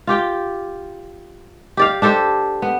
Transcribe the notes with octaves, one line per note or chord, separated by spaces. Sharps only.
F4 G4 G5
G4 D5 F5
D4 G4 A4 C5
B3